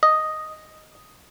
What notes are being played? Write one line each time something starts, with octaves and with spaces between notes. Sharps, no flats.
D#5